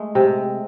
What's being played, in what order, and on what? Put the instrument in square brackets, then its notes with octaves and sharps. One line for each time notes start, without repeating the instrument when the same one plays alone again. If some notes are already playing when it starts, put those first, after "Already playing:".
Already playing: [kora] G#3 A3
C3